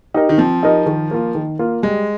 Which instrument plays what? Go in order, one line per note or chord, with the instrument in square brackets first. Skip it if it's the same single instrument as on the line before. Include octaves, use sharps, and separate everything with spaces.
[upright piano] D#4 G4 A#4 D#5
[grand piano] D#3
[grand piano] F3 [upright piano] C4
[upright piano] D#4 G4 A#4 D#5
D#3
A#3 F4
D#3
A#3 F4
[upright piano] G3 [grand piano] G#3